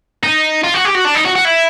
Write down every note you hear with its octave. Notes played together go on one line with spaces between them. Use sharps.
D#4
F4
F#4
G4
F#4
D4
D#4
F#4
F#4
E4